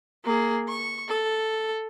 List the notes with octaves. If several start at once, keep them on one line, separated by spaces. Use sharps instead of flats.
A#3 G#4
C#6
A4